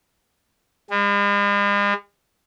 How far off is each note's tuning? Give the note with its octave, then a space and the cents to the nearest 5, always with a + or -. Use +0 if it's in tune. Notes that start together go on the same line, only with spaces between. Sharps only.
G#3 -45